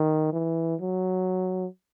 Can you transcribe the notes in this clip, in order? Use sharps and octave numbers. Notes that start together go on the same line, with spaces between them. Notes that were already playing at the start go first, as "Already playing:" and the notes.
Already playing: D#3
E3
F#3